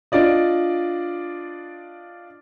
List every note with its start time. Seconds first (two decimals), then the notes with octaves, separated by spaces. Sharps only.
0.12 D4 F4 D5 D#5